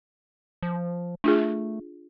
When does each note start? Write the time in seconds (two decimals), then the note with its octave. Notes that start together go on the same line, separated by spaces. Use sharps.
0.63 F3
1.24 A3 D4 F4 G#4